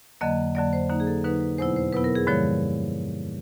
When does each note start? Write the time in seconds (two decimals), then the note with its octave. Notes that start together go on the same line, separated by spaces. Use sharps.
0.21 F2 D3 F#3 A#3 D#5
0.55 F2 D3 F#3 A#3 D5
0.73 C5
0.90 D3 F#3 A#3 D#4
1.00 G#4
1.07 A4
1.24 D3 F#3 A#3 D#4 B4
1.41 B4
1.58 E2 B2 F#3 B3 E4 C5
1.76 C5
1.92 E2 B2 F#3 B3 E4 B4
2.04 A#4
2.15 G#4
2.27 G2 D3 F3 G#3 C#5